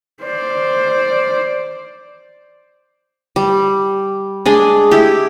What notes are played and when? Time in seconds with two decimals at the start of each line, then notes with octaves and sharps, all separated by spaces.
0.23 C5 D5
3.36 G3
4.46 G#3 D4 G#4
4.91 E4 G4